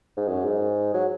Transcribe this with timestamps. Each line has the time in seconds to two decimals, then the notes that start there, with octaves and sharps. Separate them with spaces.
0.17 G#2
0.28 F#2
0.45 G#2
0.94 F#3